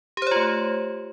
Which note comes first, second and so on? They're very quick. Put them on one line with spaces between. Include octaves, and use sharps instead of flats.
G4 C5 C#5 F4 A3